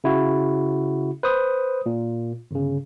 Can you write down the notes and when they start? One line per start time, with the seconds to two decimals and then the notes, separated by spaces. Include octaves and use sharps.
0.04 C#3 E4 F#4
1.23 B4 C5 D#6
1.86 A#2
2.51 G1 C#3